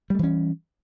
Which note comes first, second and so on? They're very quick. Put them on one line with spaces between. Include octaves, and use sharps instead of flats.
G3 A3 E3 C#4